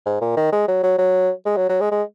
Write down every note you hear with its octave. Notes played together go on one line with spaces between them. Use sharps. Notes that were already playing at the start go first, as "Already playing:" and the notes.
G#2
A#2
D#3
G#3
F#3
F#3
F#3
G#3
F#3
F#3
G#3
G#3